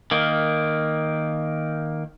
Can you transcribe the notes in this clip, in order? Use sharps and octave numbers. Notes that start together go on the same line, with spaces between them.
D#3 A#3